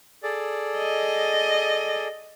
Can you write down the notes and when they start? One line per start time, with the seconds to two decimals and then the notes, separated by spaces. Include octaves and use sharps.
0.23 G#4 A4 D5
0.78 D#5